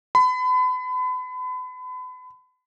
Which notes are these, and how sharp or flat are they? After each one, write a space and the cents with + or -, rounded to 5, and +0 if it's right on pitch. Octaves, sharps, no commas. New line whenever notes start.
B5 +35